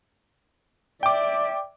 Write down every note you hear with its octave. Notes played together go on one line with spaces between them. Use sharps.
D5 E5 G5 D6